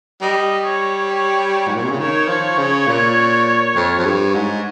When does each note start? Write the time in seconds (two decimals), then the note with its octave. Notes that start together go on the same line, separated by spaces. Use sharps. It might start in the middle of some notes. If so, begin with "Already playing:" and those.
0.22 G3 D#5
0.66 C#5
1.10 C#5
1.68 G#2
1.76 A#2
1.84 C3
1.92 C#3
1.99 D#3 C#5
2.28 F3
2.58 C#3
2.87 A#2
3.76 F2
3.99 F2
4.05 G2
4.35 G#2